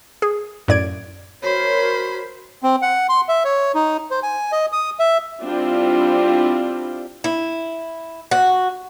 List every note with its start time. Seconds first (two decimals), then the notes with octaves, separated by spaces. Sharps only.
0.22 G#4
0.68 F#2 A2 D5 G#6 D7
1.43 F#4 A#4 C5 C#5 B5
2.63 C4
2.82 F#5
3.09 C6
3.28 E5
3.44 C#5
3.75 D#4
4.11 C5
4.23 G#5
4.52 D#5
4.72 D#6
4.99 E5
5.42 G3 C4 D4 E4 F4
7.24 E4
8.31 F#4